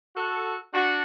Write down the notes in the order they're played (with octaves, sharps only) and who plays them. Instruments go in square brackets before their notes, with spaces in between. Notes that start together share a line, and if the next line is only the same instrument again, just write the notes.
[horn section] F#4 A4
D4 F#4